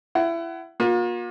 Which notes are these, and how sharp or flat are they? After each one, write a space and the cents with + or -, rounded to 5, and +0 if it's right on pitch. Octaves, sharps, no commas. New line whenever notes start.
E4 +25 F#5 +25
A#3 +35 F4 +45